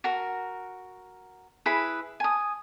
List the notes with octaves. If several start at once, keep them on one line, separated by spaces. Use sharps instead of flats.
F#4 A#4
E4 G#4 B4 B5
G#5 D#6